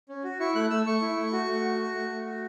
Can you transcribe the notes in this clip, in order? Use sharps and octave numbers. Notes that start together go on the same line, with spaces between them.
C#4
F#4
E4 C#6
A3 F#6
A3 E6
A3 C#6
E4
A3
F#4
A3
F#4
F#4
A3
A3
F#4